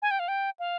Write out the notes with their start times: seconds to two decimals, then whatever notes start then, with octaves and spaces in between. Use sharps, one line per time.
0.02 G#5
0.11 G5
0.19 F5
0.28 G5
0.59 F5